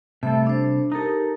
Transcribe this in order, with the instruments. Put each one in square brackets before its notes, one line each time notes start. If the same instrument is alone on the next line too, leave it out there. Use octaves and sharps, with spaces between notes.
[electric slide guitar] C3 G3 A4 [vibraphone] A3 E5
[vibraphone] D4 C5
[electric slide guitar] D#4 A4 [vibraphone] G4 A#4 A#5